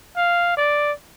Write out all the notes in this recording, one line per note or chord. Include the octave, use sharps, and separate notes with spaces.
F5
D5